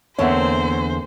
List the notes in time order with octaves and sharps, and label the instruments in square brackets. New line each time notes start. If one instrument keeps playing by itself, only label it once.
[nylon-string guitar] E2 D3 [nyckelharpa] A#3 C4 [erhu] C5 [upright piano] C#5 E5 F#5